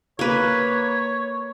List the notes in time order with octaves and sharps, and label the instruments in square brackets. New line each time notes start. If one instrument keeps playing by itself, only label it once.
[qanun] A#3 B4 [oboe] C#5